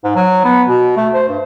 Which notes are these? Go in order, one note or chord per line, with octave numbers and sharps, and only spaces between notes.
G#2
F#3
B3
B2
A3
C5
G2